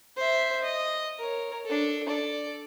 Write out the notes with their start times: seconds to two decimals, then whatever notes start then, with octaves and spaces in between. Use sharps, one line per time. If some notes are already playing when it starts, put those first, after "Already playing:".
0.17 C5 E5
0.62 D#5
1.19 A#4 C#5
1.66 D4 A4
2.08 A4 D5